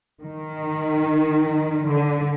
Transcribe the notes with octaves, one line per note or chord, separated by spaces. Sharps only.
D#3
D3